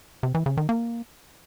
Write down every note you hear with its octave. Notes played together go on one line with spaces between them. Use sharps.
C3
E3
C#3
D#3
A#3